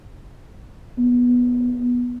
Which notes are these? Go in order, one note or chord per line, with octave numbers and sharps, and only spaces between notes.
B3